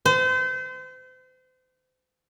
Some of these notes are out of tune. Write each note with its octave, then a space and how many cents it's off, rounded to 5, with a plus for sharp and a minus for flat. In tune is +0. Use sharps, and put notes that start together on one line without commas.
C5 -35